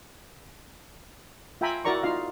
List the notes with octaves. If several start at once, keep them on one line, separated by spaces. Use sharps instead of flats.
F4 E5 G5 G#5 A#5 B5
E4 F#4 A#4 D5 A#5 C#6
D#4 F4 F5